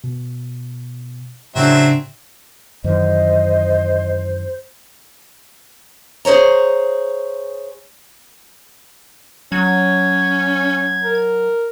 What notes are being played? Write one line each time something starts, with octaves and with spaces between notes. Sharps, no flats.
B2
A2 C#3 F#3 C4 D4 E5
F#2 D#3 E3 C5 D#5
G#4 C5 C#5 A#5
F#3 C#4 G#6
A#4